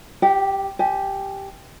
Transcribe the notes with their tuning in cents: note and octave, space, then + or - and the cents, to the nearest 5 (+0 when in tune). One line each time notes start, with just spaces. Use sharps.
G4 +0 G5 -40
G4 +0 G#5 +25